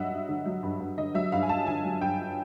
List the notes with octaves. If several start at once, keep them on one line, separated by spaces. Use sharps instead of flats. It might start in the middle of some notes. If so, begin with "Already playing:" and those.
Already playing: G2 F#3 D#5 E5 F#5
G2
D3
F#3
G2
G2
D3 D#5
F#3 E5
G2 F5
G#5
G2 A5
D3 G#5
F#3
G2 G5